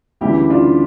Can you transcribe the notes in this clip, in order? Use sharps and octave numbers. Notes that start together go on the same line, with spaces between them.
D2 C#3 E3 G3 E4 G4
D4 F4